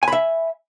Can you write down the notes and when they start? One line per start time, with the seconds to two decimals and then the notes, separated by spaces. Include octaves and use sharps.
0.03 G#5
0.08 B5
0.13 E5